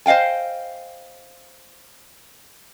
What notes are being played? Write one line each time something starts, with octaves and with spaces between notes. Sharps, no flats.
C5 D#5 F5 G5 G#5